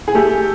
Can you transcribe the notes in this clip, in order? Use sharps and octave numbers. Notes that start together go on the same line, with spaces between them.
G#4
A3 G4 A4